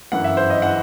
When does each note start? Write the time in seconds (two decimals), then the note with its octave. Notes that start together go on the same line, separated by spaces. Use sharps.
0.12 G1 F#2 E3 F#5
0.24 E5
0.37 C5
0.50 D#5
0.62 E3 F#5